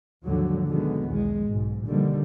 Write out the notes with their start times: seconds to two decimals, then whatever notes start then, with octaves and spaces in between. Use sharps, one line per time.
0.24 D#2 G#2 D3 F3 F#3
0.66 B2 D3 D#3 F#3 G#3 B3
1.06 B1 E2 G#3
1.47 B1 G#2
1.87 B2 D3 D#3 F3 G3 A#3